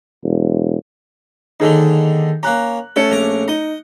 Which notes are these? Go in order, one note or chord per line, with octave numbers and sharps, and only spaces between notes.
E1
D#2 D3 D#3 D#4 G#4 A4
A#3 C#4 A#5 F#6
A3 C#4 A4 C#7
A#1 A#5 D6
D#4 D#5